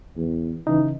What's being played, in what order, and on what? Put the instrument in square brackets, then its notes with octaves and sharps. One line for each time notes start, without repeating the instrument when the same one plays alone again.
[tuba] E2
[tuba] C#3 [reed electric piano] E3 D#4